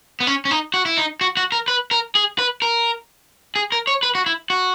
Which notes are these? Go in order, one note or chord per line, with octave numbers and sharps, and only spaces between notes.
B3
C#4
C#4
D#4
F#4
E4
D#4
F#4
F#4
A#4
B4
A#4
G#4
B4
A#4
G#4
A#4
C#5
B4
F#4
E4
F#4